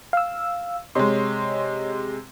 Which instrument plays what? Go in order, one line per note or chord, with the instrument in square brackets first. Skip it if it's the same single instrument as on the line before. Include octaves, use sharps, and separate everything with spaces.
[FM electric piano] F5 E6
[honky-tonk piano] C3 G#3 [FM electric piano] C#5 D#5 C6